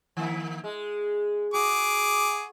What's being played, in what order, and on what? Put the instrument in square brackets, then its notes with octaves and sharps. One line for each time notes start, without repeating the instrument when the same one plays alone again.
[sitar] D#3 A#3 E4
G#3
[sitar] F#4 [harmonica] G#4 D6